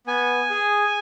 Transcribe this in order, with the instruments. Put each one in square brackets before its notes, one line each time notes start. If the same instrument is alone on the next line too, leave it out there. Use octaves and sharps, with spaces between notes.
[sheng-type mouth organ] B3 G#5
G#4